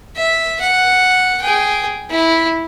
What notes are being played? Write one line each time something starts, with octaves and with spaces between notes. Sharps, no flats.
E5
F#5
G#4 G5
E4